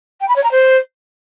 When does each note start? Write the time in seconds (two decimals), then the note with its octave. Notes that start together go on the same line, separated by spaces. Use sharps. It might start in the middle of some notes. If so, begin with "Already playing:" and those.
0.20 G5
0.28 B5
0.36 C#5
0.43 A#5
0.51 C5